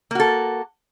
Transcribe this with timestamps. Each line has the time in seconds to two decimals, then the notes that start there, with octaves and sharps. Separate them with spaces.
0.11 A#3
0.15 F#4
0.20 A4